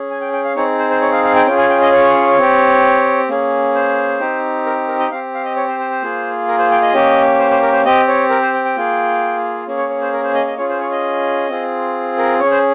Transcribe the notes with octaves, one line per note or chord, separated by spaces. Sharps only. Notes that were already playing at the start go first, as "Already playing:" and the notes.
Already playing: C#4 G#4
G#5
G5
G5
F5
C4 D#4 G#4 C#5
C5
C5
C#5
F5
F5
G5
C#4 F4 G#4 G5
G#5
G5
D#5
C#5
C4 G4
A#3 C#4 G#4
C5
C4 D#4 G4
A#4
A#4
D#5
C4 G4 F5
F5
D#5
C#5
C5
C5
C5
A#3 F4 G#4
A#4
C5
G5
D#5
A#3 C#4 G4
C5
C5
A#4
C5
C4 G4 D#5
C#5
A#4
C5
G5
G5
A#3 F4 G#4
A#3 C#4 G#4
C#5
C#5
C5
A#4
C5
D#5
D#5
C#4 F4 G#4 C#5
C5
C#5
D#5
C4 F4 G#4
A#4
C#4 G#4 C#5
C5